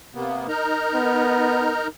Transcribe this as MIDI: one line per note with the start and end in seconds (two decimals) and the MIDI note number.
0.15 0.47 48
0.15 0.47 58
0.15 0.47 59
0.48 1.87 63
0.48 1.87 70
0.48 1.87 82
0.94 1.80 59